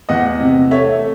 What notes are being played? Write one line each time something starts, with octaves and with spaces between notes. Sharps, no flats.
E2 D#5 F#5
C3
A3 C#5 E5